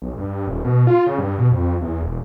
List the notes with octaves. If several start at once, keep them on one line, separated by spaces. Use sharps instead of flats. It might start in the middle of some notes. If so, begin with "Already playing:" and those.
B1
G2
D#1
B2
F4
C#3
G2
B2
F2
E2
E1